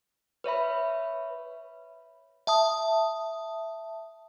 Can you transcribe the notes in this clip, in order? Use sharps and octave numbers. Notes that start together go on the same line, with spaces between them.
B4 C#5 E5 B5
E5 A5 D#6